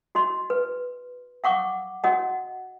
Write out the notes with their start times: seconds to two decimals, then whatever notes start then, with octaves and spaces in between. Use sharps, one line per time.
0.15 F#4 D#5 C6
0.50 B4
1.44 F5 F#5 C#6 D6
2.04 F#4 D#5 F#5